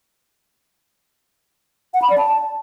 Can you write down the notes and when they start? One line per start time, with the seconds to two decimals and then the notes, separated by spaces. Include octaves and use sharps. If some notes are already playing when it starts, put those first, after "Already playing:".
1.94 F#5
2.02 B5
2.10 D5
2.18 A5